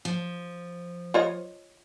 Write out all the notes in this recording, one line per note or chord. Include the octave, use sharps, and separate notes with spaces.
F3
F4 C#5 D#5